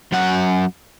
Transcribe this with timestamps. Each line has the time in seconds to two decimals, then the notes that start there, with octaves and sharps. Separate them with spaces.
0.12 F#2 F#5